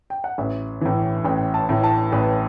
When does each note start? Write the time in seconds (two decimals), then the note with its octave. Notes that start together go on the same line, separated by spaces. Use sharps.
0.10 G5
0.24 F#5
0.38 A1 E5
0.81 A2 E3
1.25 A1 G5
1.54 A5
1.69 A2 E3
1.84 A5
2.12 A1 B4